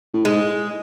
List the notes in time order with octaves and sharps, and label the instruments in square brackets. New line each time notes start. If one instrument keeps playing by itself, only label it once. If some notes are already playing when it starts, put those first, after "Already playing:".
[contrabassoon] A2
[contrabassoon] G#2 [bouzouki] G#3